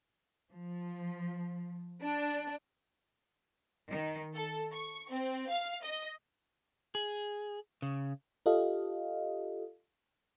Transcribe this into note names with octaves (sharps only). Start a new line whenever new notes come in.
F3
D4
D#3
A4
C#6
C4
F5
D#5
G#4
C#3
F4 G4 A4 D#5 F5